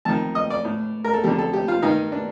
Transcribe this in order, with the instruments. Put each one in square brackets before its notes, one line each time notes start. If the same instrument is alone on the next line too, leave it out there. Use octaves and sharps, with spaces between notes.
[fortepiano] F2 D#3 A5
D#5
D5
A2
A#4
A4
F2 D3 G4
A4
G4
F4
G2 D#3 D#4
D4